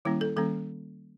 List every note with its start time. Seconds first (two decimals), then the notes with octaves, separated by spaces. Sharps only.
0.05 D#3 G3 A#3 C#4 E4
0.21 A4
0.36 D#3 G3 A#3 C#4 A4